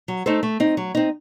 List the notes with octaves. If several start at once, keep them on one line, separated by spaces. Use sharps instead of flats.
F#3
A3 D#4 A4 C5
A3
C4 D#4
F#3
C4 D#4